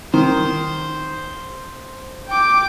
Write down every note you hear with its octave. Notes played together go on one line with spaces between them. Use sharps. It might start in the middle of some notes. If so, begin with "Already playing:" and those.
D#3 C5
G5 D6